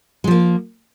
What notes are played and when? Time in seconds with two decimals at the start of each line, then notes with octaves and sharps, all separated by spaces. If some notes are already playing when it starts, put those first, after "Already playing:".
0.24 G#3
0.27 F3
0.31 A#3